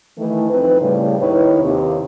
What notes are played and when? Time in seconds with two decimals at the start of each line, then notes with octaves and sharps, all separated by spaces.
0.18 D#3 E3 A3
0.49 F2 C4 D#4 B4
0.80 A2 C#3 G3
1.18 D#2 D#3 E4 B4 C#5
1.63 D#2 C3